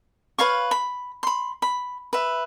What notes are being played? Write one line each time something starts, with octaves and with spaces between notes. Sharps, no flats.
B4 C#5 F5 C#6
B5
B5 C6
B5
B4 E5